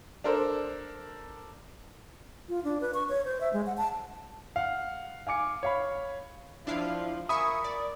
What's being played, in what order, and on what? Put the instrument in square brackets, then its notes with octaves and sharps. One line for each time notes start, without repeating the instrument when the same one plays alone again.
[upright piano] D4 A4 A#4 C5
[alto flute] F4
D4
B4
C#6
C#5
C5
E5
G#3
F#5
A5
[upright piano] F5 F#5
F5 G#5 D6 C#7
C#5 F5 B5
[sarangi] F3 [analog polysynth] D4 E4 F5
[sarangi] A#4 [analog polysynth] E5 G#5 C#6 [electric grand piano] B5 D#6
[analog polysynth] D5